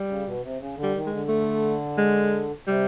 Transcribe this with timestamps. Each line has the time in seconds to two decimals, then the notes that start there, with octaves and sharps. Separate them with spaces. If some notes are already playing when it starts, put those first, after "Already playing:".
Already playing: G3
0.08 C#3
0.26 B2
0.43 C3
0.60 C#3
0.76 D3
0.83 G3
0.95 D#3
1.06 G#3
1.12 D3
1.28 A3
1.98 G#3
2.67 C3 G3